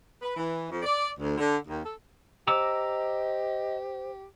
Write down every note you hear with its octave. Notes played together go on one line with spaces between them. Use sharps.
B4
E3
F2
D5
D2
D3
D#2
A4
G4 C5 D#5 A#5 D6 E6